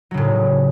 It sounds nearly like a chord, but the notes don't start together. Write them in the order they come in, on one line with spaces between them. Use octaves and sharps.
F#3 C#3 A2